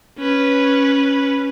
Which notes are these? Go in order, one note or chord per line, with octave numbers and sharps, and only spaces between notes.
C#4 B4